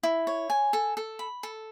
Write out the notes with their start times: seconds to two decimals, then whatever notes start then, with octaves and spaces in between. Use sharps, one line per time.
0.03 E4
0.27 C#5
0.50 G#5
0.73 A4
0.97 A4
1.19 B5
1.43 A4